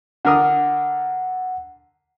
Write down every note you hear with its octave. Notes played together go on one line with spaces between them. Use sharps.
D3 A#4 F#5 D#6